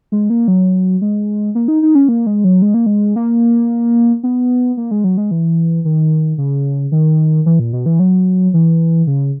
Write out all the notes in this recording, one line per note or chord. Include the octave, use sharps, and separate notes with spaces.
G#3
A#3
F#3
G#3
A#3
D#4
D#4
C#4
A#3
G#3
F#3
G#3
A#3
G#3
A#3
B3
A#3
G#3
F#3
G#3
E3
D#3
C#3
D#3
E3
A#2
B2
E3
F#3
E3
C#3